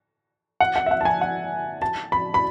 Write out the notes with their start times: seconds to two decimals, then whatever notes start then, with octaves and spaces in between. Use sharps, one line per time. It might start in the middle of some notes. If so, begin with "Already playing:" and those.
0.60 F#5
0.76 F#5
0.86 E5
0.91 F#5
1.01 A5
1.05 G#5
1.21 F#5
1.82 A5
2.12 B5
2.34 B5